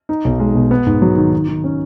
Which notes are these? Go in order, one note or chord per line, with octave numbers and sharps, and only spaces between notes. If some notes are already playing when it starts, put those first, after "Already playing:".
D#4
B1
G#3
B2
B3
G#2
F#3
D#3
D#3
D#3
C#4